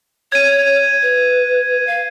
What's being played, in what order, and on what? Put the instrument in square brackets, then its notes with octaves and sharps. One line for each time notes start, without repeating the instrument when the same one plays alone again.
[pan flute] C#5 [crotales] G#6 D#7
[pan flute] B4
F5